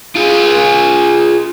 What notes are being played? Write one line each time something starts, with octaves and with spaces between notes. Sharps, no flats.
F4 G#4